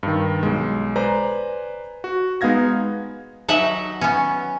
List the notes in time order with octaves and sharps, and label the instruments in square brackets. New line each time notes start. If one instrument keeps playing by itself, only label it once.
[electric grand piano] G2 D#3
B1 G#3
B4 C5 D5 G#5 A#5
F#4
G#3 B3 D#4 F5 G#6 A#6
[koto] F#3 D#4 E5 F#5
B3 C#4